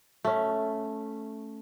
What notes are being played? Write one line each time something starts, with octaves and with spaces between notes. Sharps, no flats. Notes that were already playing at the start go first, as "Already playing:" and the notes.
A3 C#4